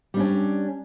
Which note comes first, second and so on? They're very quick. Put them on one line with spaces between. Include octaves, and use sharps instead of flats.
G3 D4 C#4